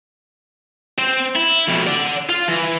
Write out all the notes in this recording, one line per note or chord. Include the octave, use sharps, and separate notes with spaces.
C4 C5
E4
F2 B2
D5 F#5
F4
E3